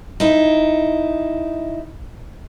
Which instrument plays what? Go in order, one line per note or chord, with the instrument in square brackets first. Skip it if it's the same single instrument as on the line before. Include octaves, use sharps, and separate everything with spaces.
[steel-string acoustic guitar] D#4 E4